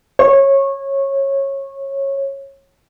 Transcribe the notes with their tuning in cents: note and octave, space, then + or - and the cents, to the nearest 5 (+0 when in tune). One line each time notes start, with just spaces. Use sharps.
C#5 -20